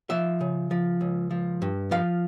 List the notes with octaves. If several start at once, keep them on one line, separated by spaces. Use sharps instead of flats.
F3 E5
C#3
F3
C#2
F3
G2
F3 F5